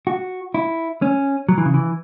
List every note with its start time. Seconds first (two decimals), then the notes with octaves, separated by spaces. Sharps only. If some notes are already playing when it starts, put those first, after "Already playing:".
0.07 F#4
0.54 E4
1.02 C#4
1.49 F#3
1.58 E3
1.66 C#3
1.74 E3